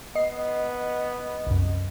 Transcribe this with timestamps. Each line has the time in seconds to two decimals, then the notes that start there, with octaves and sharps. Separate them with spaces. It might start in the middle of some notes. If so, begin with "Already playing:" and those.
0.15 B3 D#5 C7
1.47 C2 F#2